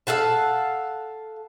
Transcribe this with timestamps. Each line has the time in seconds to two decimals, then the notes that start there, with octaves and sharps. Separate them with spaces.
0.07 A4 F5 F#5 A5